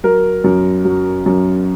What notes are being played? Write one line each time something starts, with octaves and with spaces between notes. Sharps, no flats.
F#3 A#4
F#2
F#3
F#2